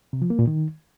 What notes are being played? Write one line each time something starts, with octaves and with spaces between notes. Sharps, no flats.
C3
F3
A#3
A#2
D#3